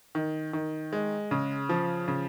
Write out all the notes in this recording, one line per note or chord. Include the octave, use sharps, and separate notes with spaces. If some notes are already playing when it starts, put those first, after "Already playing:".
D#3
D#3
G#3
C#3
F3
C#3